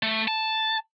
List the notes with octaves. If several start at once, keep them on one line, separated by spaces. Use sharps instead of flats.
A3
A5